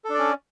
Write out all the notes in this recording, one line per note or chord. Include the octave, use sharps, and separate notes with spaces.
C#4 D4 A4 D5